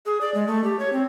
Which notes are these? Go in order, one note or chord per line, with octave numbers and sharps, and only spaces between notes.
G#4
D5
G#3
A3
G4
C#5
C4